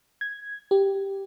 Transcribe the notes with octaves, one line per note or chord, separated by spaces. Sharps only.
G#6
G4